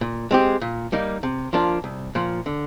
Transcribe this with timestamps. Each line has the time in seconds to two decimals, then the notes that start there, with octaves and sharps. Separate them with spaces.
0.01 A#2
0.31 G#3 C4 G4
0.61 A#2
0.92 G3 A#3 D#4
1.23 C3
1.53 F3 A#3 D4 F4
1.84 C2
2.15 A#2 F3
2.46 D3